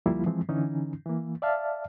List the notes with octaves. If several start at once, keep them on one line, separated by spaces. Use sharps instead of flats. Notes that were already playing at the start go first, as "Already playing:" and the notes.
D2 F3 G3 A#3 E4 F4
E3 F3 G#3 C4
D3 E3 C#4 D#4
E3 A#3
D5 E5 F5 A5 F6